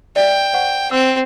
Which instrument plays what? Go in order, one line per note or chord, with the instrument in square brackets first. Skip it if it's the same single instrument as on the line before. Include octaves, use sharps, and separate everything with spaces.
[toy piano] D5 E5 [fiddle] G5
[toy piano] C5 F#5 C#6
[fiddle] C4 [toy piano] E6